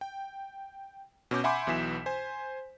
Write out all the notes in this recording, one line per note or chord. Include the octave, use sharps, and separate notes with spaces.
G5
B2 C#4 D6 G6
E5 F#5 G#5 B5 C6 D6
B1 B2 E3 B6 E7
C5 G#5